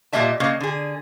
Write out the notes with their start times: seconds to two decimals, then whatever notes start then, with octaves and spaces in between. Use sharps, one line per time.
0.13 A#2 G3 A#3 D#5 E5 A5
0.40 C#3 A#3 D#5
0.60 D3 G#4